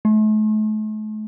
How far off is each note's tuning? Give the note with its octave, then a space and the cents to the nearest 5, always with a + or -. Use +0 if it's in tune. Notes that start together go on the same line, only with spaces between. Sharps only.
A3 -40